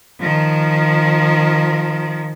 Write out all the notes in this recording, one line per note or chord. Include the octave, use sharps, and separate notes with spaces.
D#3 F3